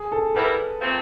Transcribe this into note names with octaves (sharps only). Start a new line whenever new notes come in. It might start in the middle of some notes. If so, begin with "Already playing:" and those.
Already playing: G#4
A4
G3 B3 E4 G4 A#4 B4
A#2 F3 A3 C4